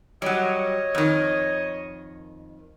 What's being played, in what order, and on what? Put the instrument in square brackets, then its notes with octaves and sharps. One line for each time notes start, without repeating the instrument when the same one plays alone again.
[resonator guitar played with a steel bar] F#3 G3 [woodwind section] C#5 D#5
[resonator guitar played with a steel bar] F2 D#3